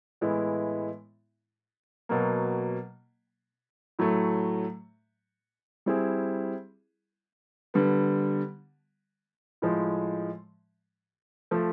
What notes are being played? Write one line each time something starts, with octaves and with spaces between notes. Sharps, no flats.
A2 E3 G#3 B3 E4
B2 F#3 A#3
A2 F#3 A3
G3 C4 E4 G#4
D3 G3 B3
A2 F3 G#3
F3 A3